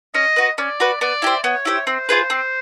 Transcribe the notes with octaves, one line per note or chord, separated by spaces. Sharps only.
C#4 D#5
F#4 B4
C#4 D5
F#4 B4
B3 D5
E4 G4 C5
B3 C#5
E4 G4 C5
C4 C5
F4 G#4 B4
C4